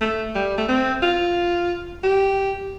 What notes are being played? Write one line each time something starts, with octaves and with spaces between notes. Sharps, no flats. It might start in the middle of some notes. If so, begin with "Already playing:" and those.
A3
G3
A3
C4
F4
G4